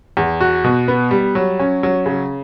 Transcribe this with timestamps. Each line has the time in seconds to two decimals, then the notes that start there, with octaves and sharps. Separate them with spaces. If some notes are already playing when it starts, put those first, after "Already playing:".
0.17 E2
0.41 F#4
0.64 B2
0.88 B3
1.11 G3
1.35 F#3
1.59 C#4
1.83 F#3
2.06 C#3